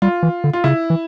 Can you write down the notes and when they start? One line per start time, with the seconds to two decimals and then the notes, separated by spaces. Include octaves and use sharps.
0.02 G3 F4
0.23 E3
0.44 D3
0.53 F4
0.64 C#3 E4
0.90 E3